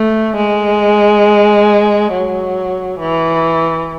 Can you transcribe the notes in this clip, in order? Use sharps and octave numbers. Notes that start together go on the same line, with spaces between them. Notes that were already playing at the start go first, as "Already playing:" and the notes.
Already playing: A3
G#3
F#3
E3